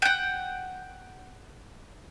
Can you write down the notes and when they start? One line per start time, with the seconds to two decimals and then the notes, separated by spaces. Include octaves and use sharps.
0.02 F#5 G5